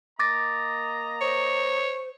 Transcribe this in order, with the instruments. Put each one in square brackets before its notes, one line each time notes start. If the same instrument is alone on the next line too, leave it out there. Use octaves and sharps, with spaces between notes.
[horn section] A#3 D#5 A#5 [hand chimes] D6 A6 A#6
[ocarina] C5 [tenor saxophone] C#5